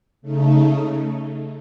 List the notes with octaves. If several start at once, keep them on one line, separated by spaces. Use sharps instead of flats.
C#3 A3 D#4